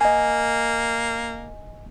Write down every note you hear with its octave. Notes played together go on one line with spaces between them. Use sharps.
A#3 D#5 G#5